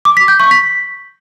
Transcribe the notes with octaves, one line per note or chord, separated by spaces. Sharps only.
D6
B6
G6
C#6
B6